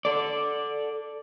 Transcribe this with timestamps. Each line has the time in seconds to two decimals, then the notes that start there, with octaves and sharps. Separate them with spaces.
0.05 A4 D5